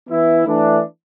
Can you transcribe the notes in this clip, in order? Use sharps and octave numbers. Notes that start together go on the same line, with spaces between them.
E3 B3 E4
E3 A3 D4